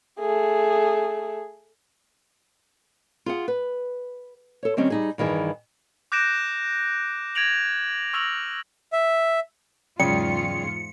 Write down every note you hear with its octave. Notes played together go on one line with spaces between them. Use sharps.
A3 G#4
F4 G#4 F#5
B4
A4 C#5
D#3 G3 C4 C#4
G3 D#4 G#4
G2 D#3 E3 G#4
D6 F#6 G6 A#6 D7 E7
G#6 A#6 D7 F7 F#7
C#6 E6 F6 A#6 F7 F#7
E5
E2 G#2 C#3 F#3 F4 D5 G5 C#7